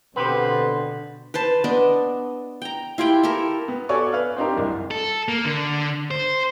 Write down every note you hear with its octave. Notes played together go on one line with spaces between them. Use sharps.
B2 D3 B3 C4 G4 B4 C5
B4 C5 A5
B3 D4 D5 D#5
G5 A#5
E4 F4 G4 G5
E4 G4 A4 A#4
B3
F#4 A4 C#5 D5 G#5 C#6
B4 F5 F6
C4 D4 D#4 F4 G4 A#4
F#1 C2
A4
A#3
D3
C5